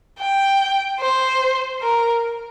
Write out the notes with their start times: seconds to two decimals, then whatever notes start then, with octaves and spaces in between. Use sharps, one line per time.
0.20 G5
1.00 C5
1.82 A#4